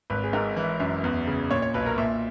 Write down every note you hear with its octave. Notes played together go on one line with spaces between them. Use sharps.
G#1 B4
G#4
G#2 A#4
E3
F#2
E2
C#3
A#2 C#5
C#5
B1 B4
A#4
A#2 E5